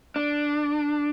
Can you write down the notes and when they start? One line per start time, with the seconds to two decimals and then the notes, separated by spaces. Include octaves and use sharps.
0.16 D4